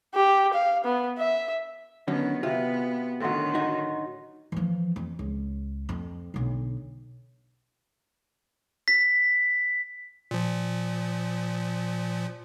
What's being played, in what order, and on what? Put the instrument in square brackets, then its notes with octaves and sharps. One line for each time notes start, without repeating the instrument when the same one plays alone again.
[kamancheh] G4
F5
B3
E5
[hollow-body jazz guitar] D3 F#3 C#4 [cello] D#3 B3
[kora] C3 [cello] B3 [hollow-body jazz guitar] F4 [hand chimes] F#4
[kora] A2 F#3 [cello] D3 D#3 [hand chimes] F#5 C6 A6
[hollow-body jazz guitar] D#4 F#4
[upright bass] E3 F3
F2
C#2
F2
B1 D3
[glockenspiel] B6
[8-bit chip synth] A#2 F3